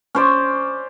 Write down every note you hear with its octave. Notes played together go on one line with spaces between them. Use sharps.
C#4 C5 D5